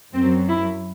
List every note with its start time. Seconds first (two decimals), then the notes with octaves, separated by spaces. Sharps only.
0.13 F#2 F#3 C4
0.48 E4